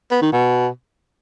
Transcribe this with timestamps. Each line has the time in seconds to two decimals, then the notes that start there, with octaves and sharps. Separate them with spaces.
0.11 B3
0.22 D#3
0.32 B2